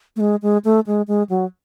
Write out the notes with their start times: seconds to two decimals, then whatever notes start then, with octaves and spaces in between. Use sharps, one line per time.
0.16 A3
0.20 G#3
0.42 G#3
0.65 A3
0.87 G#3
1.08 G#3
1.30 F#3